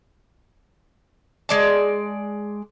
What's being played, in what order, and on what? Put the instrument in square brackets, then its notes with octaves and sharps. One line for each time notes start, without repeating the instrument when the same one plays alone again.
[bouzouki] G#3 D5 A5